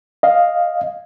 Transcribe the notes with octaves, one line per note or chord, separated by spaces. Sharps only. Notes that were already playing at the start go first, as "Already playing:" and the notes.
D#5 F5